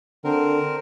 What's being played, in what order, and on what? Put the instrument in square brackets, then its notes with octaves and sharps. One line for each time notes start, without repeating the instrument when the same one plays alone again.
[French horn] D3 [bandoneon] C4 A#4